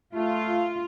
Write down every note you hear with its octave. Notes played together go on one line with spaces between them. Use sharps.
A3 F4